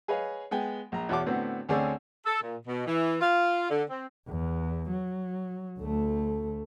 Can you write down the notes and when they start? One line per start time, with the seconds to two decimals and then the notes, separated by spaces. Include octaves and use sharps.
0.08 G#4 B4 C#5 D#5 F5
0.51 G#3 B3 G5 G#5
0.92 A#1 A#5
1.09 E2 B2 C#5 E5 A5 D6
1.26 A2 D3 B3 C4 F#4
1.69 D2 D3 C4 C#4 G#4 D5
2.25 A4
2.41 A#2
2.66 B2
2.87 E3
3.21 F4
3.70 D3
3.90 C4
4.29 E2
4.90 F#3
5.79 D2 A3